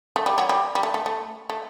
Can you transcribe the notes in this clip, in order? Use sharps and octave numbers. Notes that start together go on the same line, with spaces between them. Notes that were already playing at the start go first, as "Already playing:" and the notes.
A3
G3
F#3
G3
G3
A3
A3
A3
A3